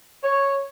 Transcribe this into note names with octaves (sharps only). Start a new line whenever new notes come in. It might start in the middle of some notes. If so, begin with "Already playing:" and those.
C#5